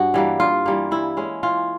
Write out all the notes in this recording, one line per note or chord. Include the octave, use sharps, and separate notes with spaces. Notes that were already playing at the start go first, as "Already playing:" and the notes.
Already playing: G2 C#4 F#4
E3 G3 A#3
G2 F4
E3 G3 A#3
E3 E4
G#3 C#4
E3 F4